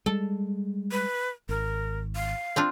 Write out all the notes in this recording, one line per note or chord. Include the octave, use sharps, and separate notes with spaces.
G3 G#3 A4
B4
G#1 A#4
F5
C4 D4 F4